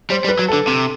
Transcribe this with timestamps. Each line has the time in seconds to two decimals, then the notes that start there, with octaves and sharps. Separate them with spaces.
0.10 G3 C5
0.24 G3
0.29 B4
0.39 F#3
0.48 D3 A4
0.67 C3